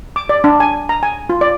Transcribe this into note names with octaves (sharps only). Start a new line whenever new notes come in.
D6
D5
D4
G#5
A#5
G#5
F4
D5